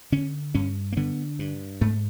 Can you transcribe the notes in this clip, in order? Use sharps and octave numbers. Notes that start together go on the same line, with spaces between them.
D3 C#4
G2 C#4
A#3
D3 B3
G2
G#2 A3